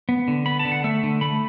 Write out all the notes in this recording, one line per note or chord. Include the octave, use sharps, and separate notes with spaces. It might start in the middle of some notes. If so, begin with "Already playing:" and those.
B3
D3
B3 B5
A5
D3
F#5
A3 E5
D3
A3 B5